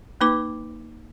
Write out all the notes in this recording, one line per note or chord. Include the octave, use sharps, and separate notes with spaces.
A#3 D#4 B4 D6